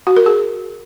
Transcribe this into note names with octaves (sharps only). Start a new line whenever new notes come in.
F#4
A#4
G#4